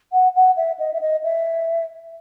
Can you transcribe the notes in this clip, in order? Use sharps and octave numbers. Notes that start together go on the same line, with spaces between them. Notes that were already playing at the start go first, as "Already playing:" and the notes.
F#5
F#5
E5
D#5
E5
D#5
E5